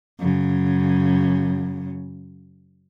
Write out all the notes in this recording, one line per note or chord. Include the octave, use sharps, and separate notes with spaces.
F#2 C#3